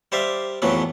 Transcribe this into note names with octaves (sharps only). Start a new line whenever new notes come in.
G3 C5 D5 E5 F5
C2 F2 A2 E3 F#3 B3